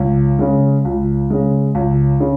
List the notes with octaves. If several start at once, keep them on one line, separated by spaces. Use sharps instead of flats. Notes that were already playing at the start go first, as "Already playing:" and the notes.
Already playing: C#2
C#3 G#3
C#2
C#3 G#3
C#2
C#3